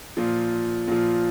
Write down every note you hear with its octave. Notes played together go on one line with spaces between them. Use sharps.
A#2 F3
A#2 F3